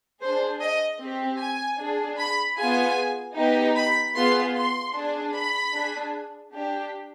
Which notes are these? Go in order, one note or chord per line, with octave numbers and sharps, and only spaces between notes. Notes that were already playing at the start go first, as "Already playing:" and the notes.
D4 G#4 C5
D#5
C4 G4
G#5
D4 G#4
B5
B3 F4 G#4 G#5
B3 D#4 G4
B5
B3 F4 G#4 C6
C6
D4 G#4
B5
D4 G#4
D4 G4